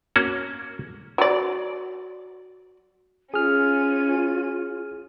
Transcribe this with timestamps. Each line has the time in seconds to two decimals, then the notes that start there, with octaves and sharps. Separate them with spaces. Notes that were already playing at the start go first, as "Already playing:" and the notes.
0.16 A#3 C#4 F#4
1.18 F#3 D5
3.34 C#4 F4 G#4 F6 D#7